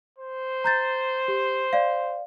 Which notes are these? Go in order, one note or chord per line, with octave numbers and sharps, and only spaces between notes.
C5
A#5 G6 A6
G4
D5 F5